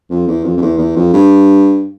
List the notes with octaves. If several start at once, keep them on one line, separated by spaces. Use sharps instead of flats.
F2
E2
F2
F2
E2
E2
F2
G2